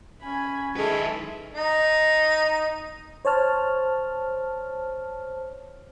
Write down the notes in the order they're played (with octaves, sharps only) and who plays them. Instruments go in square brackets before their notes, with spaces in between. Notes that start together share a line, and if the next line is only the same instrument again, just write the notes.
[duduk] C#4 [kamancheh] G#5 B5
[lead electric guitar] D#3 B4 [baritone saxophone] G#3 [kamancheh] E4 A4
[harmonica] D#4
[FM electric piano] C5 C#5 A5 F6